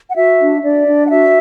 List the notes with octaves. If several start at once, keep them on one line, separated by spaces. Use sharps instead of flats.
F#5
F#4 E5
D4
D4 D5
D4
F#5
F#4 E5